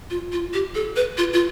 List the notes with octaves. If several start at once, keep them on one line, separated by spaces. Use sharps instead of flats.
F4
F4
G4
A4
B4
F4
F4